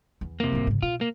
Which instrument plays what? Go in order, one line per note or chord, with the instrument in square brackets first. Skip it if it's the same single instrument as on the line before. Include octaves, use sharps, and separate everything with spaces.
[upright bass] E2
[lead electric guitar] C3 A#3
[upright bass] G#1 F#2
G#2 C#3
[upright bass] B2 [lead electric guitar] F4
[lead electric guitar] A#3